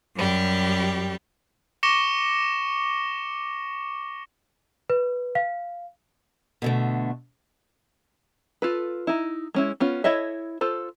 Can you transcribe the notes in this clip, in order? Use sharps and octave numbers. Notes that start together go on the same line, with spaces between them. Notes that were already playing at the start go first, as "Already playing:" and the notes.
F#2 G3 G4
C#6 D6 A#6 C#7 E7 G7
B4
F5
B2 D3 A3
F4 A4 B4
D#4 E4
G#3 C#4 E4
B3 C#4 F4
E4 A4 C#5 D#5 E5
F4 A4 C5